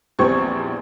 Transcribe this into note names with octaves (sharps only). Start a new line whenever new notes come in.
A#1 E2 G3 C4 C#6 G#6